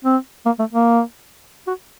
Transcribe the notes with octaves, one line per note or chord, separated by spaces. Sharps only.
C4
A#3
A3
A#3
F#4